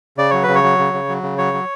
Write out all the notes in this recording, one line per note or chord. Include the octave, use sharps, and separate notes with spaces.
C#3 D5
F#3 C#5
C#3 B4
C#5
F#3
C#3
C#3
F#3
C#3
F#3 C#5
F#3